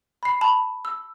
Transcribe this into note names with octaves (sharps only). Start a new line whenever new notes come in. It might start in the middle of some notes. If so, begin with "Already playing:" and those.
B5 C7
A5 B5
E6